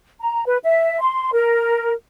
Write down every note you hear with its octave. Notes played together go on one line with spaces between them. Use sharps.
A#5
B4
E5
C6
A#4